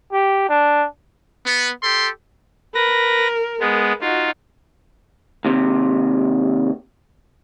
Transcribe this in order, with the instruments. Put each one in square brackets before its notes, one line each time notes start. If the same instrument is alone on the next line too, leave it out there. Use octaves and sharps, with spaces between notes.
[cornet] G4
D4
[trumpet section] B3
G4 A4 C6
[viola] A#4 [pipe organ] B4 A#6
[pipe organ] G#3 B3
[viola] D#4 F#4 [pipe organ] F4
[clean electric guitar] D#2 C3